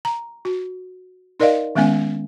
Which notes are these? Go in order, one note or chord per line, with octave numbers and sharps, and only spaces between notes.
A#5
F#4
D#4 A#4 D5 D#5 F5
D#3 G#3 B3 C#4 G#5